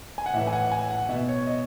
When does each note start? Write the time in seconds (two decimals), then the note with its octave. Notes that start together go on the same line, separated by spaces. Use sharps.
0.18 G#5
0.26 F#5
0.33 A2 E3 E5
0.47 G#5
0.53 F#5
0.72 G#5
0.90 F#5
1.09 B2 E5
1.29 C#5
1.47 D#5